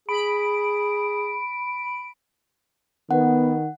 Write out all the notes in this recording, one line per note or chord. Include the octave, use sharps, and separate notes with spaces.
G#4 B5 D7
D#3 B3 F#5